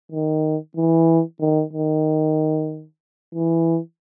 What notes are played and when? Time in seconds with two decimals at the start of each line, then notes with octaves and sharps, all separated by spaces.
0.12 D#3
0.77 E3
1.41 D#3
1.73 D#3
3.35 E3